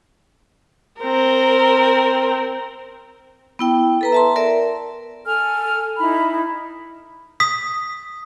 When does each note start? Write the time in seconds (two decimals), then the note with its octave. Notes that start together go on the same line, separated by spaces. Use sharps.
1.00 C4 A#4
3.59 B3 E4 G5
4.01 A4 B4 A#5
4.12 E5 A5 C6
4.36 A#4 D5 E5
5.25 A4 G#5 F6
5.98 D#4 E4 B5
7.40 D#6 B6